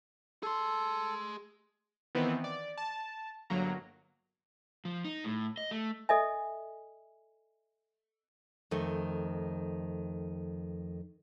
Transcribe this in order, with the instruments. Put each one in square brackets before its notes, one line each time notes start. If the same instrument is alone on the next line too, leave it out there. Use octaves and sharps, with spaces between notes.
[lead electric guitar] G#4 C6 [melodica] A4
[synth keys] D#3 E3 B3 C4
D5
A5
G1 F#3 A#3 A#5
[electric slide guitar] F3
D#4
A2
D#5
A3
[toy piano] A4 D#5 E5 G#5
[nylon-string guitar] F2 D#3 A3